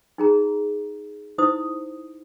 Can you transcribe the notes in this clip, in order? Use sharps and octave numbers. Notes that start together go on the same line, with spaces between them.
D#4 G#4 A#5
D#4 E4 C5 D#6